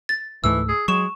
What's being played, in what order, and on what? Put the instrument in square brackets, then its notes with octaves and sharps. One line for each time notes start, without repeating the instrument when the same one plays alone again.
[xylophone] A6
[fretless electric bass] C#2 G#2 A3 [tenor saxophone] E3 [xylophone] E6
[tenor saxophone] G#4
[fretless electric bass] F#3 [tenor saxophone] G#3 [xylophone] C#6 E7